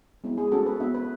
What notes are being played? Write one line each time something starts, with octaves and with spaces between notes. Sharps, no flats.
G#3 B3 E4
G#4
A3 C#4 F#4 A4
B4
B3 D4 F#4 E5
B4